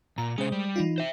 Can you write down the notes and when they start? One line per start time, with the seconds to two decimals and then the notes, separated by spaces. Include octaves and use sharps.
0.18 A#2 A#5
0.38 C3 G#3 C#4 C5
0.52 G3
0.76 E3 D#4 F4
0.98 C5 E5